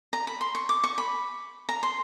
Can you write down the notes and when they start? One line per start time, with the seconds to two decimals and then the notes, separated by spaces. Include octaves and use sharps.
0.13 A#5
0.27 B5
0.41 C6
0.55 C#6
0.69 D6
0.84 C#6
0.98 B5
1.69 A#5
1.83 C6